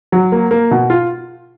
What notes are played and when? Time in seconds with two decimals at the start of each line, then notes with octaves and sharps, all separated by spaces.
0.12 F#3
0.32 A#3
0.51 A#3
0.71 B2
0.90 F4